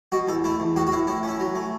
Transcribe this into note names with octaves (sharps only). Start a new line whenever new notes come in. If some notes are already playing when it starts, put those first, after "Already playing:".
B2 F#4
E2 A4
A3 E4
E2
A2 F#4
F#4
A2 E4
A2 E4
C#4 E4
F#3
A3